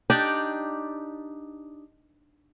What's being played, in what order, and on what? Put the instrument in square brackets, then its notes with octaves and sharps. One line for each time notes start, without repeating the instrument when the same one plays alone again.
[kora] D4 D#4 G4 D5